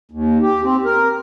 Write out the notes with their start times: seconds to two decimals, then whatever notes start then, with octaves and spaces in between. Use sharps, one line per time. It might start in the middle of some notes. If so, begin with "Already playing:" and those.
0.11 D#2
0.42 G4
0.63 C4
0.85 A#4